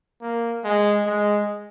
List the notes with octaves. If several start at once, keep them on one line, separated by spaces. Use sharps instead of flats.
A#3
G#3
G#3